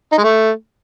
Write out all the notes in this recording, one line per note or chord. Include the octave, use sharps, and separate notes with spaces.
D#4
G#3
A3